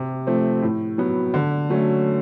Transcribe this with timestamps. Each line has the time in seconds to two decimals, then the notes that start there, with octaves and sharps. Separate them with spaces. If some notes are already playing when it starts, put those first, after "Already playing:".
Already playing: C3
0.27 F3 A3 C4
0.62 A2
0.98 F#3 B3
1.34 D3
1.70 F#3 A3 C#4